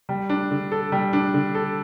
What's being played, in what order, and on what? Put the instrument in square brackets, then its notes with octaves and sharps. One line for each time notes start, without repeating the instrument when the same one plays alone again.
[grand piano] G3
D4
D3
A4
G3
D4
D3
A4